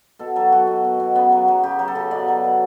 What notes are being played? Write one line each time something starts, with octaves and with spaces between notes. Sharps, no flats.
B2 A4
F#3 A4
F#3 F#4
B2
B2
B2
C#3 B3
F#3
F#3
C#3 G4
F#3
A4
C#3
B2 D5
F#3
B2